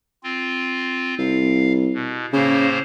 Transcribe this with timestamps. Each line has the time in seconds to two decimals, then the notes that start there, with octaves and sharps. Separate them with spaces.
0.23 C4 F4
1.19 C2 F5
1.94 B2
2.33 A2 C#3 A#3 C5